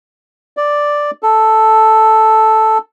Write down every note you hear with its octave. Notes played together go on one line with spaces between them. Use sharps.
D5
A4